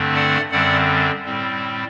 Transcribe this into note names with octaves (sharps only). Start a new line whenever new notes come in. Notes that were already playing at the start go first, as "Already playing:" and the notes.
Already playing: G2 D3 A3 C4
D5 F#5
F#2 D3 G3 C4 D5 F#5
A2 G3 C4